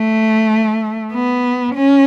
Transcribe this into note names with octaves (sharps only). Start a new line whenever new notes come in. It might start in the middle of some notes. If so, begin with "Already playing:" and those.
Already playing: A3
B3
C#4